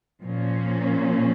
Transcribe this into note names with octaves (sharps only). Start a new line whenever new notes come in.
A#2 F3 A#3 C#4